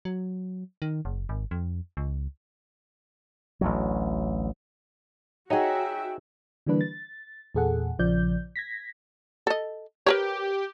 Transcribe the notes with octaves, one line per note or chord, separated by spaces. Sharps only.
F#3
D#3
F#1
G#1
F2
C#2
A1 D2 F#3
D#4 F#4 G#4 C#5 D#5 E5 F#5 G5
D3 E3 G3 A#3 D4 B4
A6
E2 A#2 G#4 A4 F#5
A#1 C#3 F3 D5 G6
G#6 A#6 B6
A4 D#5
G4 A#4 B4 C#5